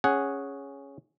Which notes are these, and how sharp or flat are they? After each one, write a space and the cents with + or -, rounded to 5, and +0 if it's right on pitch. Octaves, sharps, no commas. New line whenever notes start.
C#4 +0 G#4 +0 F#5 +0